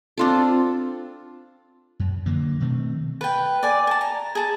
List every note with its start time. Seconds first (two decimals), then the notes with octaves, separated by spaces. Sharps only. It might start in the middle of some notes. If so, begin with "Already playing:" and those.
0.18 C4 D4 F4 A4
2.00 F#2
2.26 D3 F#3 A#3
2.60 B2 D#3 A3 C4
3.21 B4 G5
3.63 D5 G#5
3.87 G#5 A5
4.01 A#5
4.35 G#4 A5